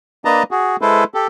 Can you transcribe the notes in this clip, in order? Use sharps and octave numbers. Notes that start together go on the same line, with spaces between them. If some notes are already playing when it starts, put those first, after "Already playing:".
A#3 D4 B4 D#5 A5 A#5
F#4 G#4
G#3 E4 A4 B4 C5
G4 A4